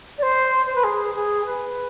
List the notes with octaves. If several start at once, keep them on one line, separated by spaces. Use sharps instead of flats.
D5
C5
C5
B4
G#4
G#4
B4